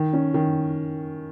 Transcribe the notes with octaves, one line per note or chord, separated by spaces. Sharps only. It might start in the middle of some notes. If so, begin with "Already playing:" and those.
Already playing: D#3
C#4
D#3